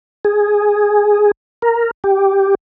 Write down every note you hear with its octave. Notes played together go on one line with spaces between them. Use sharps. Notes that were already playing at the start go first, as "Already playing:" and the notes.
G#4
A#4
G4